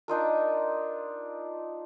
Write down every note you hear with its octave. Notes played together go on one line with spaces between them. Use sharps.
D4 D#4 F4 A#4